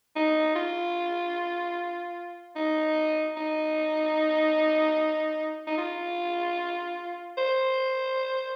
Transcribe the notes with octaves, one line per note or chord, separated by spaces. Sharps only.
D#4
F4
D#4
D#4
D#4
F4
C5